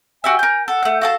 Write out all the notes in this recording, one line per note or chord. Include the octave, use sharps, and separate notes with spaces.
F#4 G4 E5 G#5
A#4 G6
A4 F#5
A3 G6
F#4 A4 F5 A5